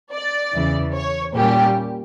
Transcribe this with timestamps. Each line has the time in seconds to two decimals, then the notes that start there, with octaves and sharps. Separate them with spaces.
0.13 D5
0.54 E2 C#3 E3
0.95 C#5
1.35 A#2 G3 A#3 C#4 G4